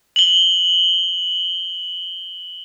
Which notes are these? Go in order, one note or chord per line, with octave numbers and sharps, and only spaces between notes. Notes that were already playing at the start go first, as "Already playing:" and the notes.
F#7 G7